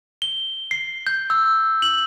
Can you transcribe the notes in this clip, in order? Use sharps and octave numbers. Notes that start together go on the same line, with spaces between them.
G7
C7
G6
E6
F#7